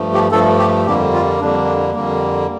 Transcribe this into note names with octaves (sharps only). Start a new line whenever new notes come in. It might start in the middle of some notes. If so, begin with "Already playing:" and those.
Already playing: G2 F3 A3
G4
G2 F3 A3 A4
G4
F2 D3 G3 A#3 G4
F4
F2 D3 G3 A#3 D4
F2 D3 G3 A#3